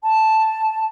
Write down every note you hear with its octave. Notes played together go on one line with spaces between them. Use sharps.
A5